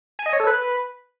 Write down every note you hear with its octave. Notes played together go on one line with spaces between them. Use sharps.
G#5
D#5
C#5
A4
B4